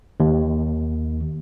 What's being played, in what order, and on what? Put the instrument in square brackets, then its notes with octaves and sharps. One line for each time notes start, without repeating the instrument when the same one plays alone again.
[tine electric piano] D#2